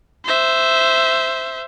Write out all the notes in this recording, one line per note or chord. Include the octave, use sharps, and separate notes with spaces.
C5 E5